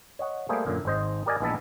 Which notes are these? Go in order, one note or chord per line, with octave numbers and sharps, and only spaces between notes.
C#5 D#5 F#5
G3 A3 A#3 G#4 C5
F#2 A#2 D3
G#1 G#2 C5 D#5
G4 A#4 D5 D#5 G#5
A#1 E3 G#3 B3 E5 A5